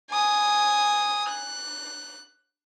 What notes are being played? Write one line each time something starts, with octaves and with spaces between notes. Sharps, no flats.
G#5 D#6
F#6